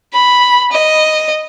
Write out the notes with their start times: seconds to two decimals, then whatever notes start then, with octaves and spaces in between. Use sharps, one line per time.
0.13 B5
0.72 D#5